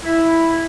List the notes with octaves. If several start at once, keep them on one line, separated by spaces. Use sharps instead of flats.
E4